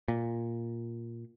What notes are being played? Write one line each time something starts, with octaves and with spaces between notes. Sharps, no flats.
A#2